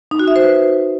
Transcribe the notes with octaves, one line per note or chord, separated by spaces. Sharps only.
D#4
F#4
E5
C5
B4